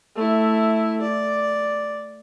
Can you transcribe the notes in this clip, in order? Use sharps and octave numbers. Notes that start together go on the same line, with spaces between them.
A3 E4
D5